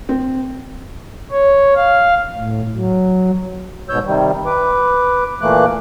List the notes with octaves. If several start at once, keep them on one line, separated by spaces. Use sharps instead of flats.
C4
C#5
F5
A2
F#3
G#2 B2 C#5 E6 G6
C3 D#3 G3
B4 D6
A#2 E3 A3 A#3 D6 F#6